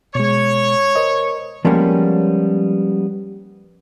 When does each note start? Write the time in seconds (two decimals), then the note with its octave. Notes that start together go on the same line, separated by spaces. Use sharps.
0.15 B2 G#3 C#5
0.96 A#4 C5 D#5
1.65 F3 G3 G#3 A#3 B3 C#4